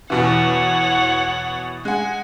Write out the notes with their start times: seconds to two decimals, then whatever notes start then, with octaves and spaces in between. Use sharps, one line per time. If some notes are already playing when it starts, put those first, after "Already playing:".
0.10 E2 B2 E3 C#5 F#5
1.85 G#3 F#5 G#5